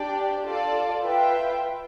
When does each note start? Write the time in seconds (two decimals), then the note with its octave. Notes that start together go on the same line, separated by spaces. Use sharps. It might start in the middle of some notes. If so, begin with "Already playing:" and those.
Already playing: D4 G4 D5 G5
0.44 F4 A4 D5 A5
1.03 F4 B4 E5 G5